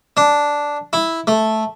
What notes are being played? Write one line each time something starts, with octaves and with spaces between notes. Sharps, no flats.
D4
E4
A3